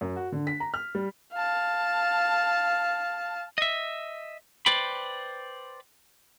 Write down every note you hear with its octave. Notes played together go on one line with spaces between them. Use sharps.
F#2
F#4
D3
B6
A#5
F6
G3
F5 A5
D#5 E5
B4 C5 D5 G5 B5